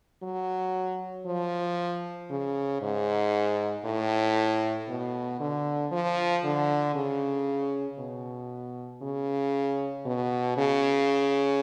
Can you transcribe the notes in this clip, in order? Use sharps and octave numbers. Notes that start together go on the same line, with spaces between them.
F#3
F3
C#3
G#2
A2
B2
D3
F3
D3
C#3
B2
C#3
B2
C#3